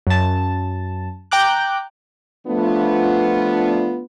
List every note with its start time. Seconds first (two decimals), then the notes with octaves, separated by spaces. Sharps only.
0.07 F#2 A5
1.31 G5 A#5 D6 F#6
2.47 F3 A3 B3 D4 F4